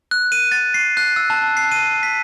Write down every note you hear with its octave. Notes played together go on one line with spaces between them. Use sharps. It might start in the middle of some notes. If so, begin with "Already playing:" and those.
F#6
D#7
A6
C7
F#6
E6
A5
C7
D#7
B6